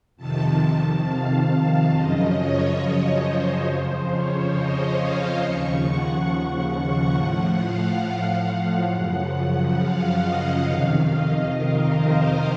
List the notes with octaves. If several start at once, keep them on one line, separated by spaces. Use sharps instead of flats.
F2 C3 D#3 A5
F5
F#2 C#3 F3 D#5
C#5
C5
F2 C#3 F3
C#5
D#5
F5
D#2 C#3 F3 C#6
F#5
F#5
A2 F3
F5
F#2 C#3 F3 F#5
F#5
F5
D#5
F2 C3 D#3 F5
D#5
A#4
C5